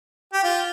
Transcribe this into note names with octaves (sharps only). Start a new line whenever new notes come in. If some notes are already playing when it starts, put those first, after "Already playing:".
G4
F4